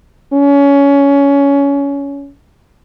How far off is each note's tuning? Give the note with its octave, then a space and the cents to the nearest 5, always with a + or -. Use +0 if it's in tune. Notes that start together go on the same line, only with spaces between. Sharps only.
C#4 +20